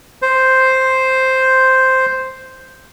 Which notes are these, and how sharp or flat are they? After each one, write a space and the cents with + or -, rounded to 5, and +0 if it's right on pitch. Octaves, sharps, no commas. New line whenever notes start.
C5 +0